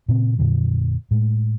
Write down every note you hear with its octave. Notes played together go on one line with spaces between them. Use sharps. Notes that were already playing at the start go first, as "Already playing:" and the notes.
A#2 C#3 C4
F2 A#2 D3 F#3
A2 G#3